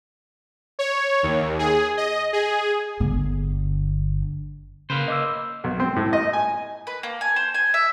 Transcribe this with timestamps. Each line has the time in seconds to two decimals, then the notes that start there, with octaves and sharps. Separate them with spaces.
0.79 C#5
1.23 D#2
1.59 G#4
1.97 D#5
2.33 G#4
3.00 G1 D3
4.90 C#3 A#3 B4 C5
5.08 D#5 D6 E6
5.64 B1
5.80 C4
5.96 A2
6.13 D#5
6.33 G#5
6.87 B4
7.03 A#3
7.21 G#5
7.36 C5
7.54 G#5
7.74 E5